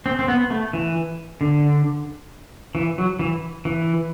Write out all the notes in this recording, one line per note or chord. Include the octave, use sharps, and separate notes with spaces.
C4
C4
B3
A3
E3
D3
E3
F#3
E3
E3